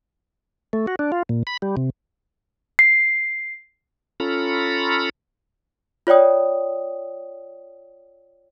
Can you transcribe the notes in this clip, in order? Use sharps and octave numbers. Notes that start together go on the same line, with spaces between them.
A3
F#4
D4
F4
A#2
B5
G3
C3
C7
C#4 F4 A4 A#5 B5
F4 C#5 D5 G5 D#6